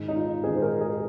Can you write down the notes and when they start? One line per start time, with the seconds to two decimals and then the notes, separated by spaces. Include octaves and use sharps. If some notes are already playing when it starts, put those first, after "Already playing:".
Already playing: G#2 D#3 G#3
0.08 D#4
0.16 F4
0.44 G#2 D#3 G#3 G#4
0.55 C5
0.62 A#4
0.81 G#4